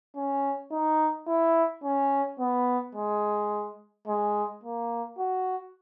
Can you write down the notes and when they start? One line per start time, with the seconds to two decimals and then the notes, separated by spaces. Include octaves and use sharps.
0.16 C#4
0.72 D#4
1.28 E4
1.84 C#4
2.40 B3
2.95 G#3
4.08 G#3
4.64 A#3
5.19 F#4